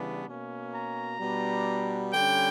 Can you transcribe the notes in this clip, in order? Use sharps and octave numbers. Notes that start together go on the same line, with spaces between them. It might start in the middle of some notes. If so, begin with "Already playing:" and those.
Already playing: C#3 E3 G3 B3 D4
B2 A#3 C#4
A#5
B2 G3 B3 D4
D3 G3 C#4 G5